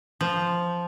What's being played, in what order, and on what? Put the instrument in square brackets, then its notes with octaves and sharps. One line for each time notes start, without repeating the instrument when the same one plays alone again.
[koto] F3